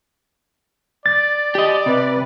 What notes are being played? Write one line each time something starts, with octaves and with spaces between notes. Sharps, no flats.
D5 A6
G4 D#5
C3 B4